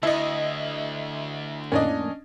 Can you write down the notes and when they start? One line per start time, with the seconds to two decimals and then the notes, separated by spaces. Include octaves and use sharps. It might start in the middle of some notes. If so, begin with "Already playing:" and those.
0.03 D2 E4 D#5
1.72 F2 A2 A#3 C#4 D4 D#5